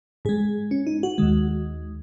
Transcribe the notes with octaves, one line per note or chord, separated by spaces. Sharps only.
G#2 G#3 G#4
C#4
D#4
F#4
D#2 D#3 G#3